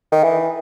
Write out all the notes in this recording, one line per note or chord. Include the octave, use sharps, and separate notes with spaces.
D#3
E3